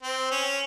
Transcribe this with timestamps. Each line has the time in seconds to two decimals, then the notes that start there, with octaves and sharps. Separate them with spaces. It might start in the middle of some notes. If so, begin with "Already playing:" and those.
0.03 C4
0.31 C#4